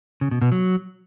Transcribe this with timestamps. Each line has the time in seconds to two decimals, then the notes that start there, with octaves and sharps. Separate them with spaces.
0.21 C#3
0.31 B2
0.42 B2
0.52 F#3